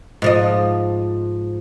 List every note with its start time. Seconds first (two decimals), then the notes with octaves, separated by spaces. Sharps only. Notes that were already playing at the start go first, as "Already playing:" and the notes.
0.22 G#2 F3 D#5